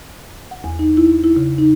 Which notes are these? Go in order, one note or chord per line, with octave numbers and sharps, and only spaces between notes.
F#5
E2
D#4
E4
E4
C#3
D#4